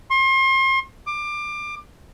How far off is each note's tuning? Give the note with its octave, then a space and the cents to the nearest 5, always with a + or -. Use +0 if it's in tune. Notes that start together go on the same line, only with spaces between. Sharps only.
C6 +35
D6 +25